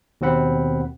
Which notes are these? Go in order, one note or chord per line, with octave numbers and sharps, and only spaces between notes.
D#2 B2 C4 F#5 B5